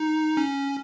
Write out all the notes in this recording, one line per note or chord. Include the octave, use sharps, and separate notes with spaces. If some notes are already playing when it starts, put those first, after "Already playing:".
Already playing: D#4
C#4